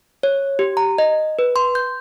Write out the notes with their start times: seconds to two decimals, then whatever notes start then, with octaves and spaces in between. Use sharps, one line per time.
0.23 C#5
0.59 G4
0.77 A#5
0.98 D#5
1.39 B4
1.56 C6
1.75 G6